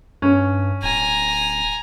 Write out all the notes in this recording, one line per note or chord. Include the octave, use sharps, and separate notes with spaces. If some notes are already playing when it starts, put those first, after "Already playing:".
G2 C#4
D1 G#5 A#5